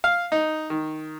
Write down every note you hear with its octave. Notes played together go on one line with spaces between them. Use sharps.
F5
D#4
D#3